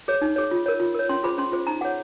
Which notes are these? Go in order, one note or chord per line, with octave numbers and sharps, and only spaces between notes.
G#4 C#5
D#4
G#4 C#5
F4
A#4 C#5
F4
A#4 C#5
C#4 C6
F4 G#4 C5 B5
C#4 C6
F4 G#4 C5
D#4 A#5
G#4 C#5 F#5